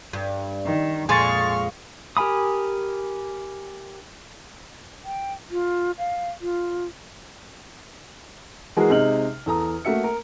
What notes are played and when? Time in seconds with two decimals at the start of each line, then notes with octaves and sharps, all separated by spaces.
0.13 G2
0.65 D#3
1.09 F2 A#2 G#3 G#5 C6 C#6 F6 A6
2.17 G4 A#4 G#5 B5 D#6
5.05 G5
5.51 F4
5.98 F5
6.41 F4
8.76 E3 G#3 F#4 G#4 A#4
8.89 C3 G#3 D#4 F6 F#7
9.46 E2 A4 A#5 D#6
9.85 A3 A#3 F#4 E5 C#7
10.04 A#4